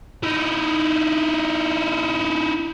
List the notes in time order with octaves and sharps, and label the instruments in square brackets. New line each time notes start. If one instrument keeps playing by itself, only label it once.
[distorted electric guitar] D#4 E4